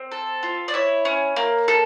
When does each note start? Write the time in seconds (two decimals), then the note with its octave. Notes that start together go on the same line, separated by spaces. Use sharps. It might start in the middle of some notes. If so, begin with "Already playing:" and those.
Already playing: C4
0.12 A4
0.43 F4
0.68 D5
0.74 E4 C#5
1.05 C#4
1.36 A#3
1.68 A4